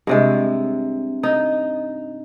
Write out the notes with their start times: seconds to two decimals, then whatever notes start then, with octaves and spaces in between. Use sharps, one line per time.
0.07 G2 C3 G#3
1.23 D#4